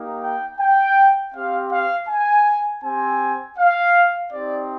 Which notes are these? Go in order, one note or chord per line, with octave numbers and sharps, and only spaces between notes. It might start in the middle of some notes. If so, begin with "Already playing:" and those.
Already playing: A#3 D#4 G4
G5
G5
C4 G4 F5
F5
G#5
C4 G4 G#5
F5
C4 D#4 G4 D5